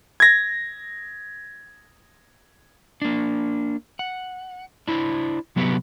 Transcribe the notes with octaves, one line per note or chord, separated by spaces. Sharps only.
G#6 A#6
A#3 D4
F#5
D4 E4 C5
C3 F#3 B3 G4 A#4 B4